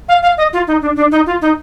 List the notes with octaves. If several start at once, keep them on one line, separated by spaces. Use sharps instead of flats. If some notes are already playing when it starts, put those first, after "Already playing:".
F5
F5
D#5
F4
D#4
D4
D4
D#4
F4
D#4